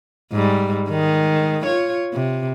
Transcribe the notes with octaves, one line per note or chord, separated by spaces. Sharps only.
G#2 G3
D#3 G#3
F4 C#5
C3